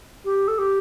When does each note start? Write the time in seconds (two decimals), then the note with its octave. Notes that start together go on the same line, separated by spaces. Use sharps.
0.25 G4
0.47 A4
0.58 G4